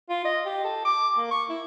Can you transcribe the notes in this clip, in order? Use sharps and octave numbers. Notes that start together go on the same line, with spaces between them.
F4
D#5
G4
A4
D6
A#3
C#6
E4